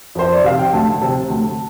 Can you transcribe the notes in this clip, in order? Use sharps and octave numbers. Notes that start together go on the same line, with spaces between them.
F2 C5
D5
C3 F5
G5
D2 A5
C3
D2